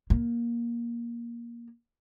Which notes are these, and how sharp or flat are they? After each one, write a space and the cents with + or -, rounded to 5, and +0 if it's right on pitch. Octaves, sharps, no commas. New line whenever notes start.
A#3 +15